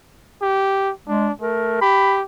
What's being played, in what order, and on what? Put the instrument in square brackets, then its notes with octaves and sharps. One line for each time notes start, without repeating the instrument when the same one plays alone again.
[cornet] G4
[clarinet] G#3 [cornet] D4
[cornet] A3 [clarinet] A#4
[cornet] G4 [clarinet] B5